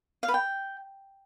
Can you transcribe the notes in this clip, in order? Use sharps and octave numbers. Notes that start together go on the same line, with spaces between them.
F5
B4
G5